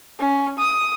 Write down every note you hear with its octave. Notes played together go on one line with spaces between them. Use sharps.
C#4
D#6